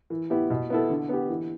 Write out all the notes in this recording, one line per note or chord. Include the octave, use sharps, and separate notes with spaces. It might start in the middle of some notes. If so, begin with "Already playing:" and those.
E3
B3 E4 G4
B2
B3 E4 A4
D3
B3 G4
E3